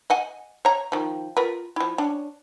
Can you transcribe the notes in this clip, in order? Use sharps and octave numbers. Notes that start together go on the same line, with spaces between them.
D#5 F#5 G#5
C#5 A#5
D#3 F3
F4 A#4 B4
F3 E4
C#4 D4